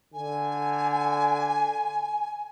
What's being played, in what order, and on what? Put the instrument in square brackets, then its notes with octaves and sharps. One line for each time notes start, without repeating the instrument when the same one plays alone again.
[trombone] D3 [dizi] G#5